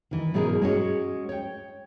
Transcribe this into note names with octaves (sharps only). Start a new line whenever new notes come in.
D#3 E3
G#2 B2 C#4 E4 G#4 A#4
G#3 C#4 F#4 C#5
C#5 G5